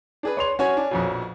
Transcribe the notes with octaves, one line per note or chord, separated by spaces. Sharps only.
D4 G#4 B4
C#5 C6 F7
C#4 F#4 C#5 G#5
D4
A#1 F2 B2